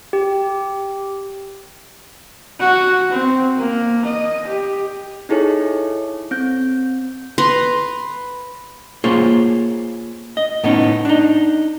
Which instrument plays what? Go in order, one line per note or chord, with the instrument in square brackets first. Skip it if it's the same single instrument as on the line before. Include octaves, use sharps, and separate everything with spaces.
[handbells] G4
[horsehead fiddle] F#4
C4
A#3
D#5
G4
[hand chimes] D#4 E4 G#4 A4 C#5
C4 G6
[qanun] B4 A#5 C6
[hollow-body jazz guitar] A#3 F4 G#4 C5 C#5
D#5
A2 B3 C#4 D#4
D4 D#4